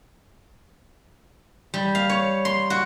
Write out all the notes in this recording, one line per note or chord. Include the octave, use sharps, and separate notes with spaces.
G3
F5
C#5
C6
F#4